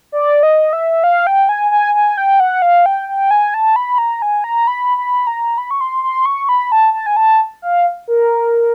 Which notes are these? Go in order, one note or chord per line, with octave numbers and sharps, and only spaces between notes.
D5
D#5
E5
F5
G5
G#5
G#5
G#5
G5
F#5
F5
G5
G5
G#5
A5
B5
A#5
G#5
A#5
B5
B5
A#5
B5
C#6
C6
C6
C#6
B5
A5
A5
G#5
A5
F5
A#4